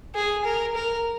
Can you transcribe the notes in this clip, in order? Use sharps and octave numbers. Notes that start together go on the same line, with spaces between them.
G#4
A#4
A#4